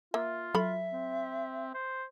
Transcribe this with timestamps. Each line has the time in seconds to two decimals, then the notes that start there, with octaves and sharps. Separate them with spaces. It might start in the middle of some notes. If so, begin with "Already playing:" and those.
0.14 A#3 F4 E5
0.55 F#3 A4 E5 B5
0.93 C4
1.74 C5